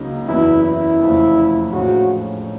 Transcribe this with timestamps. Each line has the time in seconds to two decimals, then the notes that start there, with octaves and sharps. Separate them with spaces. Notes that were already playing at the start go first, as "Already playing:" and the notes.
Already playing: C#2 C#3 F#3 A#3 D#4
0.28 F#1 E2 C#3 F#3 B3 E4
0.64 E4
1.00 F1 E2 C#3 F3 A3
1.72 A#1 A2 F3 G#3 C#4 F#4